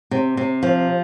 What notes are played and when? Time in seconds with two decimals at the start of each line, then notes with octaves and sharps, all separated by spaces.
0.11 C3
0.37 C3
0.63 F3